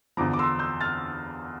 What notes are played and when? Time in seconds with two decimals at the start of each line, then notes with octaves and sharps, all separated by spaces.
0.17 E2 D3 F3 A#5 D6
0.33 D6
0.39 C6 E6
0.59 E6 G6
0.81 F6 A6